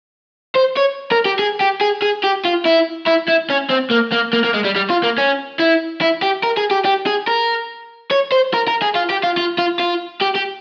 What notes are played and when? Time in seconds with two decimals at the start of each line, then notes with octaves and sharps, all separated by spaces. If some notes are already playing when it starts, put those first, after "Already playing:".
0.56 C5
0.77 C#5
1.12 A#4
1.25 G4
1.39 G#4
1.60 G4
1.81 G#4
2.02 G#4
2.24 G4
2.45 F4
2.66 E4
3.07 E4
3.28 E4
3.50 C#4
3.70 C4
3.91 A#3
4.13 A#3
4.33 A#3
4.44 A#3
4.54 G#3
4.65 G3
4.76 G3
4.90 F4
5.03 A#3
5.18 C#4
5.59 E4
6.01 E4
6.22 G4
6.43 A#4
6.57 G#4
6.71 G4
6.85 G4
7.07 G#4
7.28 A#4
8.11 C#5
8.32 C5
8.54 A#4
8.68 A#4
8.82 G#4
8.95 F4
9.10 G4
9.24 F4
9.37 F4
9.58 F4
9.80 F4
10.22 G4
10.36 G4